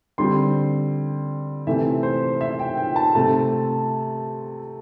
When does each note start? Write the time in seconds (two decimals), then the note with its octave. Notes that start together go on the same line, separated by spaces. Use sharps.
0.18 D3 G3 C4 C6
1.67 C3 E3 A3 C4 E5
2.03 C5
2.41 E5
2.59 G5
2.77 G5
2.96 A5
3.15 C3 A3 C4 A5